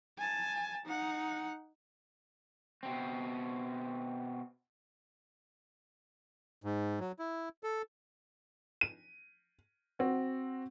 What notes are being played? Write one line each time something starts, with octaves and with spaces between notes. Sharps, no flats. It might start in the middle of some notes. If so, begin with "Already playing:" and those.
G#5 A5
D#4 F#5
B2 C4
G#2
F#3
E4
A4
D#7
C4 F#4